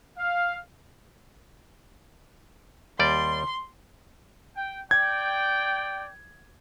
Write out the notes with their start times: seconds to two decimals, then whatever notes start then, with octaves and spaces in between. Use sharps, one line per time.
0.17 F5
2.99 D#2 G3 D5 C6
4.56 G5
4.91 D5 G5 G#6